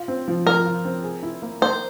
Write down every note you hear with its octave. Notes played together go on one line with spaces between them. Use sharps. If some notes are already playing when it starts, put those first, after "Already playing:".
Already playing: F4
C4
F3
F3 A#4
F4
C4
G#4
E4
A#3
A#3 C5